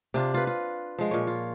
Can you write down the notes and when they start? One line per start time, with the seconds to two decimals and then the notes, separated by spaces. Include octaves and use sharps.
0.14 C3 D4 F4
0.34 F4 B4
0.47 F4
0.98 F3 G#3
1.11 A#2 C#5
1.27 F4